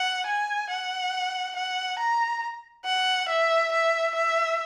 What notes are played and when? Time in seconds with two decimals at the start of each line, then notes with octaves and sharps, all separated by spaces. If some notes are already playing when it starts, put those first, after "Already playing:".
Already playing: F#5
0.26 G#5
0.69 F#5
1.56 F#5
1.99 A#5
2.85 F#5
3.28 E5
3.72 E5
4.15 E5